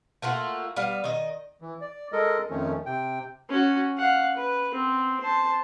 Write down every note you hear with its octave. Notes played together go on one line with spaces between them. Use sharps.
A3 A#3 F4 F#4
G3 B3 F5
D#3 D#5
E3
D5
G#3 A4 A#4 D#5
F2 D#3 F3 A3 C#4
C3 G5
C#4 F#4
F5 F#5
B4
C4
C5 A5